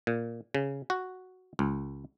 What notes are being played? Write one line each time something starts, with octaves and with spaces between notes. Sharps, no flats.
A#2
C#3
F#4
C#2